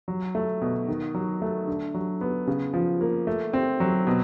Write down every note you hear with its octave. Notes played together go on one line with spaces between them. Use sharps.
F#3
A3
B2
D#3
F#3
A3
D3
F#3
B3
C#3
F3
A#3
A3
C4
F#3
B2